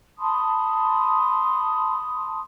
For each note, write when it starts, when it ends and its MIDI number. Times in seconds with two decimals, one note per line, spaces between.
0.19 2.40 81
0.19 2.40 83
0.19 2.40 84
0.19 2.40 87